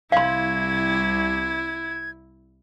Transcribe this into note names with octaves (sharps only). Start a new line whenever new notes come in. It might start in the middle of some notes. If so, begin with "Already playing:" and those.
C2 E4 F5 C6 G#6